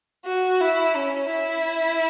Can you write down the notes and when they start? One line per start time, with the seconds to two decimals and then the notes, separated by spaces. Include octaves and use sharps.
0.25 F#4
0.61 E4
0.96 C#4
1.32 E4